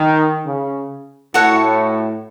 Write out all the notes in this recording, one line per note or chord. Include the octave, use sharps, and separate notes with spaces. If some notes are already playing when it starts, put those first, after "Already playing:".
Already playing: D#3
C#3
A2 F#4 A4 C#5 F#5